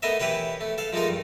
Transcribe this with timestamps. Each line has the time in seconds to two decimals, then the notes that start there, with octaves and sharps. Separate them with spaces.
0.02 A3 B3 A#4 D#5 E5
0.20 E3 E4 G4 B4 C#5
0.61 A3
0.78 A4 F5
0.93 F3 G#3 A3 D#4 A#4
1.08 G2